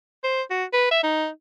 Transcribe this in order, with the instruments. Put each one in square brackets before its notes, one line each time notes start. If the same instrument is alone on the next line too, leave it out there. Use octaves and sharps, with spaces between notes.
[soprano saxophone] C5
F#4
B4
E5
D#4